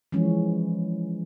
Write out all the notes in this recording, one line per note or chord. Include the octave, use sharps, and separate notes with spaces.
E3 F3 G#3 C#4